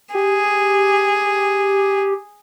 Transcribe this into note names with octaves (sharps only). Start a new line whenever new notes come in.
G4 G#4